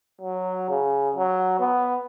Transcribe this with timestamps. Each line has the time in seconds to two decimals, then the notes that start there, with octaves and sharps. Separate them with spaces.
0.22 F#3
0.70 C#3
1.16 F#3
1.60 B3